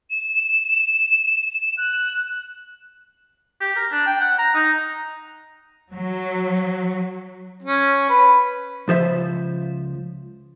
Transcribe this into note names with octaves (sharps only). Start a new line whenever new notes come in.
E7
F#6
G4
A#4
D4
G5
F#5
A#5
D#4
F#3
C#4
B4
C#2 F3 C5 E5